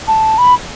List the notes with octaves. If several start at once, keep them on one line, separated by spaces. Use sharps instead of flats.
A5
B5